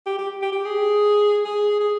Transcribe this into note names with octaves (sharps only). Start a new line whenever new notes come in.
G4
G4
G4
G4
G#4
G#4
G#4